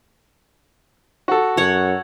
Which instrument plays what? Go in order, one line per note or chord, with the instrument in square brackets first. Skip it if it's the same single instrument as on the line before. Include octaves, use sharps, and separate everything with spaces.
[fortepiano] F#4 A4
[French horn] F#2 [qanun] C#5 F#5